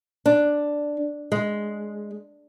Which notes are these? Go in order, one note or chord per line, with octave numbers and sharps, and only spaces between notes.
D4
G#3